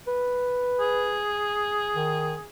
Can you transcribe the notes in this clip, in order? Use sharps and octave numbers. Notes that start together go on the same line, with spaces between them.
B4
G#4
D#3